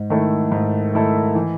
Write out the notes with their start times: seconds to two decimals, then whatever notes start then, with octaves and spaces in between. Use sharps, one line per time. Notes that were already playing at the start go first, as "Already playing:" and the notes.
Already playing: G#2
0.10 D#3 A3 E4 A4
0.52 G#2
0.93 D#3 A3 E4 A4
1.35 E3